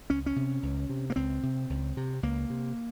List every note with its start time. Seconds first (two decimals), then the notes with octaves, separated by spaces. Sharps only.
0.10 C#2 C#4
0.26 C#4
0.36 C3
0.63 C#2
0.89 C3
1.10 A#3
1.16 C#2 C4
1.43 C3
1.70 C#2
1.97 C3
2.23 C#2 A#3
2.50 C3